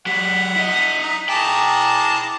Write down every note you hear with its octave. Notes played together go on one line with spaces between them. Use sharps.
F#3 G4 F#5 B6
E4 D#5
D#4
E4 G#4 G5 A5 A#5 D6